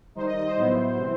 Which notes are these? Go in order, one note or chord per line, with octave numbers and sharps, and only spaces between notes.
D#3 G3 D#4 C5
D#5
D#5
C5
A2 F#3 B3 E4
C3 E3 G3 C4